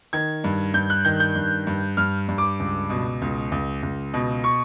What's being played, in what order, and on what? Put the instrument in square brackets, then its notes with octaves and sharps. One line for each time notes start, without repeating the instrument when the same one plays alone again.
[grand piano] D#3 G#6
G2
G2 G6
F#6
D#3 G6
G6
G2
G2
G2 F6
G2
D6
C#2
B2
C#2
C#2
C#2
B2
C#6